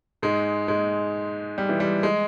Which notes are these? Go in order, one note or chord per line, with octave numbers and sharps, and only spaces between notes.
G#2 G#3
G#2 G#3
G3
E3
G3
G#3